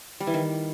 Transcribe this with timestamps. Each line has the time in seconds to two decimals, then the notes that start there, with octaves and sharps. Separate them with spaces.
0.20 G3
0.27 E3
0.34 D#3